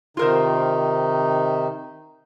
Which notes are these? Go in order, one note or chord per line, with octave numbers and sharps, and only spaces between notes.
C3 D#3 D#4 F4 A#4 C5